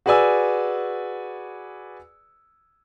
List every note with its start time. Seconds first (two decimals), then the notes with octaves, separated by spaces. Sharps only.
0.06 F#4 G#4 B4 D5 G#5 E6